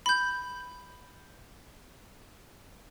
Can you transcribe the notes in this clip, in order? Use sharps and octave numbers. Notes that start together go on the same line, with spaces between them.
B5 G6